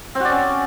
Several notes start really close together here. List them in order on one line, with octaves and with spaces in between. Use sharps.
C4 F#4 D5 C#4